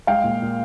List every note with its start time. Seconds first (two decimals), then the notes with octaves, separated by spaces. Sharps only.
0.07 G#3 F5 G5
0.24 A#2
0.42 A#2